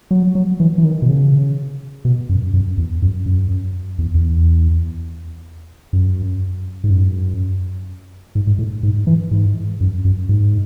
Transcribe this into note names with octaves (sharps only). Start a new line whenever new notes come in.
F#3
F#3
E3
E3
D#3
B2
C#3
B2
F#2
F#2
E2
F#2
F#2
E2
E2
F#2
G#2
F#2
G#2
G#2
A2
G#2
E3
G#2
F#2
F#2
G#2